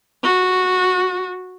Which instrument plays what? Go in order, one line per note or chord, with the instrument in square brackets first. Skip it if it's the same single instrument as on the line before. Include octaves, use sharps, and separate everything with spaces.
[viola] F#4